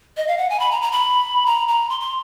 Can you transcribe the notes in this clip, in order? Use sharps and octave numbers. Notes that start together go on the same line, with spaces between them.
D#5
F5
F#5
G#5
B5
A#5
A#5
B5
A#5
A#5
C6
C6